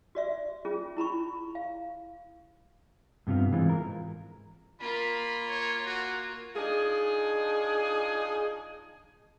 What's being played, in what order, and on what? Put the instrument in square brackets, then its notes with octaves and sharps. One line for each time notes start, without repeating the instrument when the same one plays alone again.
[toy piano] F#4 D5 E5
C#4 F4 G#4
E4 A#5 B5 C#6
F5
[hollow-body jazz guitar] G2 C3 B3 F4
G#2 E3 G#3 C4 F4
A#4
[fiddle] A#3 F4 [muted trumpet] B5
[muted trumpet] C#5
F#4
[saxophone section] D4 D#4 F4 G#4